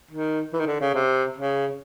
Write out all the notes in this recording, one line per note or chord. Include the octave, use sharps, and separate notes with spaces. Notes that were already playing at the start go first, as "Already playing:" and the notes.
D#3
E3
D#3
D3
C#3
C3
C#3